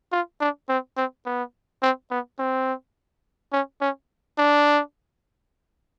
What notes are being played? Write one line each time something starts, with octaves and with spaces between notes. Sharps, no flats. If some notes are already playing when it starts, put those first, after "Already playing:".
F4
D4
C4
C4
B3
C4
B3
C4
C#4
C#4
D4